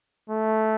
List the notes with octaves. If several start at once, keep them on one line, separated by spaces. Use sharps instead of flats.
A3